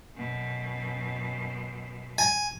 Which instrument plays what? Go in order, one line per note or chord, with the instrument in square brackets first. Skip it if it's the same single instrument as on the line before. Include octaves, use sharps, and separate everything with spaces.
[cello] F#2 B2
[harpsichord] G#5